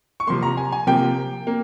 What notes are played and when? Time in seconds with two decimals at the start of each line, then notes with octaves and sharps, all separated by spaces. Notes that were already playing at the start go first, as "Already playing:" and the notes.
0.20 C#6
0.27 C3 F3 A#3 C6
0.43 A#5
0.57 G#5
0.72 G#5
0.87 C3 F3 A#3 G5
1.47 A#3